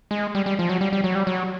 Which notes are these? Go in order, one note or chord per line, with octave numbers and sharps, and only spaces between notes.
G#3
G3
G3
F3
F#3
G3
G3
F#3
G3
F#3